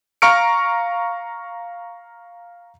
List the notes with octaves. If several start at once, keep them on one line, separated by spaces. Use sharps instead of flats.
F5 A#5 C#6 F6 C#7 D7